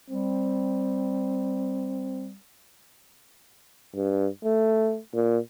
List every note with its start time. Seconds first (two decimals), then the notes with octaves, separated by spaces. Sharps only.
0.10 G3 C4
3.95 G2
4.44 A3
5.14 A#2